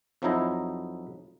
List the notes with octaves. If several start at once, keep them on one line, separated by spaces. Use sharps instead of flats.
F2 F3 F#3 D#4 E4 A#5